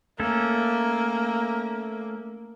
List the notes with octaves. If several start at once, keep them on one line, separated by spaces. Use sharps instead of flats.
A3 A#3 C#4 A4